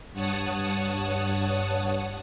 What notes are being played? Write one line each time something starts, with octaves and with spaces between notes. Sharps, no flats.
G2 C#5 F#5 A5 D#6